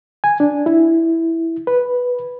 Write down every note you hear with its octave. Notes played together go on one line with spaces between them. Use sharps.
G#5
D4
E4
B4